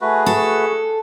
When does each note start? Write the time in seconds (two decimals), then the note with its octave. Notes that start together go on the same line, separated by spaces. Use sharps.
0.01 A3 F#4 G#4 B4
0.26 A4